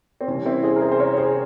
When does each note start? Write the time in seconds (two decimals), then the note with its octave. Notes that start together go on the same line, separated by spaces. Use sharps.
0.21 C4
0.28 C2 C3 E3 C#4
0.46 C4 E4
0.63 G#4 C5
0.76 A#4
0.81 G#4 C5
0.92 C5
1.00 A#4 C#5
1.17 G#4 C5